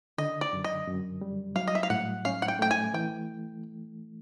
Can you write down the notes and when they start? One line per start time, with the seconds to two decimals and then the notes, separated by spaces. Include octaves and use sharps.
0.18 D3 D#5
0.41 D5
0.53 F#2
0.64 D#5
0.88 F#2
1.21 G3
1.56 F#3 F5
1.68 D#5
1.75 E5
1.83 F5
1.90 A2 F#5
2.25 C#4 F5
2.42 F#5
2.48 G5
2.59 A3 G5
2.71 G#5
2.94 E3 G5